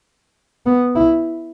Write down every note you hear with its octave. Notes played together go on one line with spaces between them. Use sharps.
B3
E4